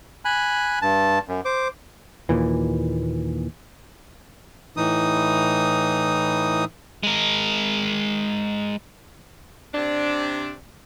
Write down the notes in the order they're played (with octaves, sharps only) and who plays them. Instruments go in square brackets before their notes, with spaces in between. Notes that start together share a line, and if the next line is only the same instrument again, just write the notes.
[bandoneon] G#5 B5 F#6
G2 A5
F#2
C5 D6
[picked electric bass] D#2 A#2 E3
[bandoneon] A2 E3 D#4 D#6
[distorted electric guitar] G#3 A#4
[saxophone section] C3 D4